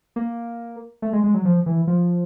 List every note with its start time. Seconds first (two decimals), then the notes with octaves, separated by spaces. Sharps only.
0.16 A#3
1.02 A3
1.13 G#3
1.24 G#3
1.34 F#3
1.45 F3
1.66 E3
1.87 F3